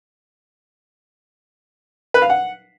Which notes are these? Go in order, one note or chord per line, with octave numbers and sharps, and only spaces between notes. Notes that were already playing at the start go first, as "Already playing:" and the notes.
B4
F5
F#5